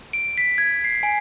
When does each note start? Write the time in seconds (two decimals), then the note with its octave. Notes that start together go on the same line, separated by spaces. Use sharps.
0.13 D7
0.38 B6
0.58 G#6
0.84 C7
1.03 G#5